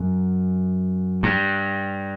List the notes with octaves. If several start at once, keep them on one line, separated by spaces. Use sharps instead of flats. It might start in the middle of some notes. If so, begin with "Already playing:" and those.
Already playing: F#2
G2